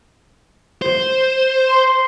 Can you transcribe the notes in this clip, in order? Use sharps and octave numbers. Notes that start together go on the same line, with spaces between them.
C5
C6